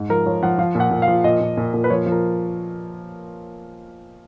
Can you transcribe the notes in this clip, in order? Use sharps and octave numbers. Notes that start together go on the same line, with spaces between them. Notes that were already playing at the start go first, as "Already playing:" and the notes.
Already playing: G#2
F3 A#4
F3 C#5
F3 F#5
F3 F5
A#2
F#5
A#2
F5
F3
A#2 D#5
A#2
A#2
A#2
B4
F3 C#5
F3
A#4